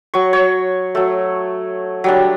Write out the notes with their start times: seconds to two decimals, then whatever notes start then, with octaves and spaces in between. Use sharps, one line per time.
0.14 F#3 C#6
0.33 C#5
0.95 F#3 A3
2.04 F#3 G3 D4